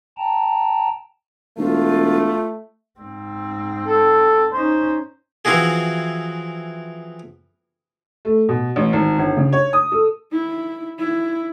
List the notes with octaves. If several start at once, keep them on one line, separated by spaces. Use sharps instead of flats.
G5 A5 A#5
E1 A3 F4
G#2 C4
A4
C#4 D#4 C5
E3 F3 C4 E4 F#4 G#4
A3
B2
A1
G#1
G1
C#3
C#5
D#6
A4
E4
E4